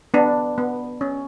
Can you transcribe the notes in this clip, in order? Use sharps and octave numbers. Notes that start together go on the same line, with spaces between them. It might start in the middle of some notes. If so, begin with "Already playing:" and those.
B3 D4
B3
C#4